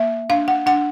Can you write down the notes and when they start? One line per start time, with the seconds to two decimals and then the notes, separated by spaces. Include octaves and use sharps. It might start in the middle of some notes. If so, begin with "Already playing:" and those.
Already playing: A#3 E5
0.30 D4 F5
0.48 F#5
0.66 D4 F#5